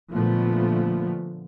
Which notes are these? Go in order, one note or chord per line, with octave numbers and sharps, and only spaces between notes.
A#2 D3 F3 A3 B3